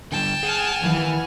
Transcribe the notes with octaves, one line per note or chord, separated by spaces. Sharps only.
D3 F3 G3 G5 A5
G#4 F#5 G#5 F6
D#3 E3 F5